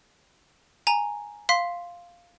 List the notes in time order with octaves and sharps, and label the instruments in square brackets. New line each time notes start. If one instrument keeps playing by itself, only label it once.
[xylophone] G#5 A#5
F5 C6 B6